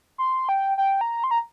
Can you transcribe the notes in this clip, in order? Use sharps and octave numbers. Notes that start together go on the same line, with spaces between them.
C6
G5
G5
A#5
C6
A#5